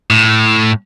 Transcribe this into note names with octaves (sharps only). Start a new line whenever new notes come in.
A2